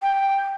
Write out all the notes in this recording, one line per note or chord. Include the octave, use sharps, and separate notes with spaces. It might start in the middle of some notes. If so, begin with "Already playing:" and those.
G5